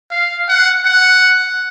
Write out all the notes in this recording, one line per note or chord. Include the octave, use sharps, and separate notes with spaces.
F5
F#5
F#5